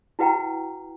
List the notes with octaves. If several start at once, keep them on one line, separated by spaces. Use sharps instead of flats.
E4 F#4 B4 F#5 G5 A#5